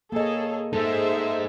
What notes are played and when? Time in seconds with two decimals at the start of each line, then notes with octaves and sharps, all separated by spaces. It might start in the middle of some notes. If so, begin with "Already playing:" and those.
0.12 A#3 G#4 A4 C#5 D#5
0.73 G#3 D#4 G#4 A4 C5 E5